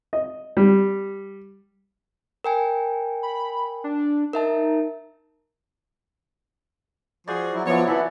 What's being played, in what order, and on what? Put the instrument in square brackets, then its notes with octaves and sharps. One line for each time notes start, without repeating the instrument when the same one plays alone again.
[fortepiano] D#5
G3
[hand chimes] A#4 G5 G#5
[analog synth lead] B5
D4
[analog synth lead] D#4 [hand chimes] A#4 E5 A5
[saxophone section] F3 G#4 [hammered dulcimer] F#4 C5 D5
[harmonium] F#3 E4
[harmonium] F3 B3 [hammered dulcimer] F#3 E4 D5 [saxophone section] C#5
[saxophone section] C3 E4 [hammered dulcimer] E3 A4 [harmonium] B3